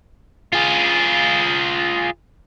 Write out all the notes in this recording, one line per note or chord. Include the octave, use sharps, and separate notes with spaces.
F4 G#4